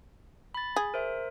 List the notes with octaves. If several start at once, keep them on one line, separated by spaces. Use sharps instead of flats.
B5 A6
G#4
A#4 C5 E5